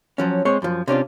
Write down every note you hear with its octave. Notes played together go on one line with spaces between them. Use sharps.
F3 F#3 C#4
G#3 C4 C#5
F#2 F3
C3 C#4 D4 F4